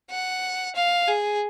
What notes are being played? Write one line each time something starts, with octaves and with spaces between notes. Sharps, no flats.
F#5
F5
G#4